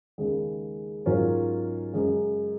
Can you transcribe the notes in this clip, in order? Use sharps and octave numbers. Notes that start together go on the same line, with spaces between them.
D#2 C#3 G#3
G#2 F#3 C#4 F4 A#4
F#2 C#3 G#3